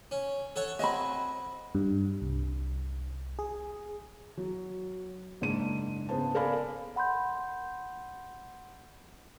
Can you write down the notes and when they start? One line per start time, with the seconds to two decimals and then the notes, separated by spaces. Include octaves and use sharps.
0.11 C#4
0.56 A4 C#5 F#5
0.79 C4 F#4 D#5 G#5 B5
1.75 G2
2.21 C2
3.39 G#4
4.37 F#3
5.41 F#1 G#2 D4 D#7
6.09 C#3 B3 C5 A5
6.35 A4 A#4 D5 F5 G#5 B5
6.96 F#5 B5 C6 G6